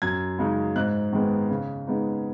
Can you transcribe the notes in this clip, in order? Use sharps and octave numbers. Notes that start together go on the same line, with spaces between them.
F#2 G#6
C#3 G#3 D#4
G#2 F#6
D#3 G#3 B3
C#3
G#3 B3 D#4